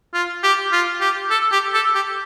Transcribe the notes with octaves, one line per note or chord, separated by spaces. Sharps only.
F4
G4
F4
G4
A4
G4
A4
G4